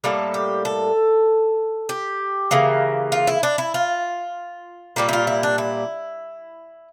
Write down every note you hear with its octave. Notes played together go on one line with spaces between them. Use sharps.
A2 G3 A#3 A4
G4
A4
G4
C#3 E3 A#3
F4
E4
D4
E4
F4
A#2 G3 A#3 G4
E4
F4
E4
D4
E4